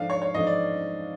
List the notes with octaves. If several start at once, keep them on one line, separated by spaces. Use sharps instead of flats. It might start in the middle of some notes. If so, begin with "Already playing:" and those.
Already playing: G#2 F3 A3 D4 F5
C#5
C#5
G#2 F3 A3 D4 D#5
D5